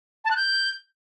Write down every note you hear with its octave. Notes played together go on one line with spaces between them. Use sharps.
A5
F#6
G6